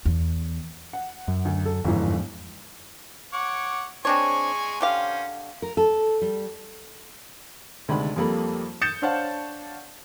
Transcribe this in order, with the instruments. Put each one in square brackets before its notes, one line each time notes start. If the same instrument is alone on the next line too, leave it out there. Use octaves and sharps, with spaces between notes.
[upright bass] E2
[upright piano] F#5
[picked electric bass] F#2
[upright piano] D2
A4
[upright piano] G1 E3 [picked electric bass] F2 G#2
[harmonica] C#5 F#5 D6
[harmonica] G#3 G#5 C#6 [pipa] C4 D4 C#5
[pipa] D3 G4 F5 [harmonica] C#4 C5
[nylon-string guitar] A#4
A4
G3
[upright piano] D2 C3 D#3 G#3 D4 B5
F2 G3 A#3 A4 B5
D#6 G6 A6 C#7 E7
D4 C5 C#5 F5 F#5 A5